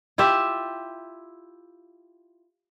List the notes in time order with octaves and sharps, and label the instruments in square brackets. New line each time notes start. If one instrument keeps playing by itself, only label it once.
[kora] E4 F4 G4 E5